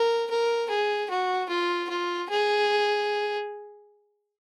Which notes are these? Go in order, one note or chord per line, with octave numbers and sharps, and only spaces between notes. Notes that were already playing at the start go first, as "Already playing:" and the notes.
Already playing: A#4
A#4
G#4
F#4
F4
F4
G#4